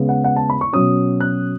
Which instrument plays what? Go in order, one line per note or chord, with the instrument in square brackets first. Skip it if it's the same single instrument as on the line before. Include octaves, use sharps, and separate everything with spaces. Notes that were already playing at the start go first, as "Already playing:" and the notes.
Already playing: [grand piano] C#3 G#3 B3
F#5
F#5
A5
B5
C#6
B2 F#3 C#4 D#6
F#6